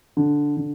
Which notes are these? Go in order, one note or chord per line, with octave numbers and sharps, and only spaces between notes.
D3
D3